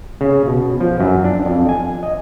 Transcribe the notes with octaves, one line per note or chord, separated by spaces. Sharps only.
C#3
B2
F3
F#2
D4
F2
G#5
D#5